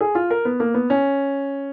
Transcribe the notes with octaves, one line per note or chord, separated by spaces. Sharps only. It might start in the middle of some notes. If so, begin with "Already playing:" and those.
G#4
F4
A#4
B3
A#3
B3
C#4